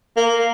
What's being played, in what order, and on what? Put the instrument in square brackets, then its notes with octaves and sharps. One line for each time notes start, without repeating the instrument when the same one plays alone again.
[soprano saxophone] A#3